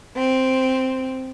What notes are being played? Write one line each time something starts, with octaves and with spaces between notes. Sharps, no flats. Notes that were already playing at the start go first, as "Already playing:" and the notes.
C4